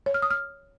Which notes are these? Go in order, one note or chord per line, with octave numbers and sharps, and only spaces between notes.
C#5
F6
D#6
F6